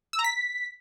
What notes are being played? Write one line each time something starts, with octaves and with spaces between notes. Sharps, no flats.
E6
A#5
B6